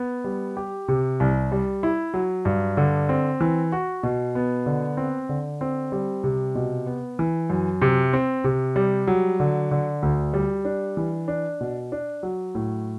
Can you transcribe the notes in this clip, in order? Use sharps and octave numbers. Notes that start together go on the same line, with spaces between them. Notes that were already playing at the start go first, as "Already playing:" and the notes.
Already playing: B3
G3
G4
C3
C2
G3
E4
F#3
G2
D3
C4
E3
F#4
B2
B3
D3
C4
D3
C4
G3
C3
B2
B3
E3
F#2
C3
C4
C3
G3
F#3
D3
D3
D2
G3
D4
E3
D4
B2
D4
F#3
A2